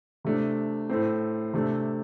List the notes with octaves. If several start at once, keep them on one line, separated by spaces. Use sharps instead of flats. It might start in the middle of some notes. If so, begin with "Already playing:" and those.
C3 A3 D4
A2 A3 C4
C3 A3 D4